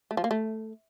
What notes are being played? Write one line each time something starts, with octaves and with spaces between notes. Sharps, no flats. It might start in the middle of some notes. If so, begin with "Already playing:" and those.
A3
F3
A#3
A3